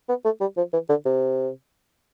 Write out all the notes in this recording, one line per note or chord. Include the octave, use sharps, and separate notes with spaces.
B3
A3
G3
F3
E3
D3
C3